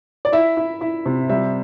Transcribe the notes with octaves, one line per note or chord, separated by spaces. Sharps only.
D5
E4 E5
E4
E4
C3
G3 E5